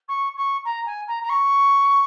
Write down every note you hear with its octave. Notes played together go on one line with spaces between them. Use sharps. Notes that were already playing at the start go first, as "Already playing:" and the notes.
C#6
C#6
A#5
G#5
A#5
A#5
C#6